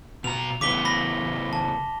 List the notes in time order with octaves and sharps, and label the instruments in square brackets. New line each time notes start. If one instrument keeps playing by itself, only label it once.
[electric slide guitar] B2 A#5 [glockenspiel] F7
[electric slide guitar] C#3 E3 B3 [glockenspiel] D6 B6 G7
[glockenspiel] B5 A#6
A5